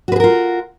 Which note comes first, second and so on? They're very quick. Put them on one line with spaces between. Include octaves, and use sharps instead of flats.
F#4 B4 G#4 A#4 F4